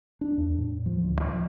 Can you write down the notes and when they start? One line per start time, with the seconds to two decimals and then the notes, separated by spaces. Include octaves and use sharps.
0.21 D4
0.37 E2
0.58 A2
0.86 F3
1.04 D2
1.22 F3